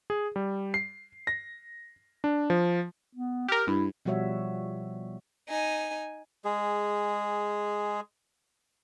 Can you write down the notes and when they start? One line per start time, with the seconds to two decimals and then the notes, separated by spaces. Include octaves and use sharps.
0.10 G#4
0.36 G3
0.74 C7
1.27 A#6
2.24 D4
2.50 F3
3.15 B3
3.48 G4 A#4 F6
3.67 G2 E4
4.05 B2 F3 G3 F#4 C#5 E5
5.48 D#4 G#5
6.45 G#3 G#4